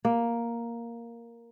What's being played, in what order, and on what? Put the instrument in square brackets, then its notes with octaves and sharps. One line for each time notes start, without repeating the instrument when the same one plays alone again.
[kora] A#3